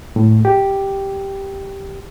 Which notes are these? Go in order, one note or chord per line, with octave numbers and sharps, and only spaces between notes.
A2
G4